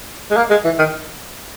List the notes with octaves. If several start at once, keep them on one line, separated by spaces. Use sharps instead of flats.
G#3
A#3
G#3
E3
D#3